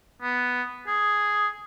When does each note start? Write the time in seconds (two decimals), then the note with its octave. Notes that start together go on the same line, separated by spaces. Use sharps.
0.22 B3
0.87 G#4